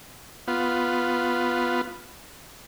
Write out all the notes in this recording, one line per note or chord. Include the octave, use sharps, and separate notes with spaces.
B3 F4